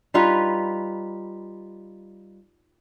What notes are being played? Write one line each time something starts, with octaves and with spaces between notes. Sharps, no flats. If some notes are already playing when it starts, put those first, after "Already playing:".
G3 D#4 F4 B4